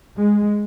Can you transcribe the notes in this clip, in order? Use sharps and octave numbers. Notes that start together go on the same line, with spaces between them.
G#3